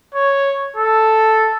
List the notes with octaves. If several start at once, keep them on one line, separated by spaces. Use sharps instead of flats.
C#5
A4